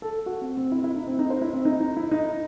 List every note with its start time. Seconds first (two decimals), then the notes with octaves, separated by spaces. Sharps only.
0.02 A4
0.26 F#4
0.41 C4
0.57 C4
0.72 E4
0.84 E4
0.96 D#4
1.07 C4
1.19 D#4
1.30 C5
1.41 E4
1.54 C4
1.65 D#4
1.80 D#4
1.97 E4
2.11 D#4